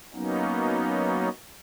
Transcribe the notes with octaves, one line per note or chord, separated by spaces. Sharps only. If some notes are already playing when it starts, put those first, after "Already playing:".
F#3 A#3 B3 C#4 D#4